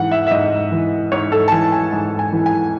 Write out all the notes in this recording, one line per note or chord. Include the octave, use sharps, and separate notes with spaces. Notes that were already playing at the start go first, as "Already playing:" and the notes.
Already playing: G#2 E3 F#5
E5
E5
G#2 D#5
E3
G#2 C#5
A4
A5
E3 G#5
G#5
G#2
G#5
E3
G#5